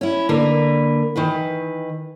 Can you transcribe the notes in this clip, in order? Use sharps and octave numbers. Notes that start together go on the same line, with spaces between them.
C#4 E4
D3 A#3 A#4 B4
D#3 E3 B4